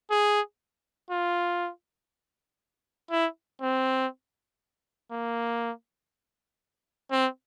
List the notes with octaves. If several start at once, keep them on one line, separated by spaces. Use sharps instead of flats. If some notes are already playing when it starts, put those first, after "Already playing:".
G#4
F4
E4
C4
A#3
C4